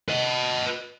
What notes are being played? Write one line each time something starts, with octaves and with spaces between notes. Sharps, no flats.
B4 D#5